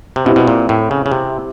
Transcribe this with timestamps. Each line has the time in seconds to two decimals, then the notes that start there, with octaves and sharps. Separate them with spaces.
0.16 C3
0.25 B2 C4 E4 G4
0.36 B2
0.47 A#2
0.69 A2
0.91 C#3
1.06 C#3
1.12 C3